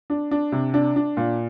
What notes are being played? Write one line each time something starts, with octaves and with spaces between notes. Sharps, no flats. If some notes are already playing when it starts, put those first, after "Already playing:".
D4
D4
C3
D4
D4
A#2